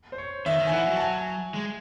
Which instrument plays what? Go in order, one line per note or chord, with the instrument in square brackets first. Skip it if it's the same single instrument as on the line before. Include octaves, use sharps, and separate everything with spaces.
[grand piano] C5
C#5
[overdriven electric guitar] D#3 [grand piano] E5
[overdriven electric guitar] D#3
[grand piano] G#5
[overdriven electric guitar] E3 [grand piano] F#5
[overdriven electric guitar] F#3
[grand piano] A5
G#5
[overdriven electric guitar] G#3